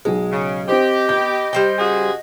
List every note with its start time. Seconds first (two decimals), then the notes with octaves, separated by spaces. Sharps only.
0.05 B1 G#3 G#4
0.32 C#3
0.68 C4 G4 C5 D#5
1.09 B3 G6
1.53 G3 C5 G5
1.78 C#3 F#4 G#4